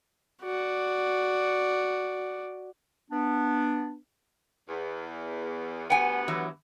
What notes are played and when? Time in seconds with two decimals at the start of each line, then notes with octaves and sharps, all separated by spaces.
0.42 F#4 D5
3.11 B3 D4
4.68 E2
5.90 D2 G2 B3 F#5 G#5
6.28 E3 F#3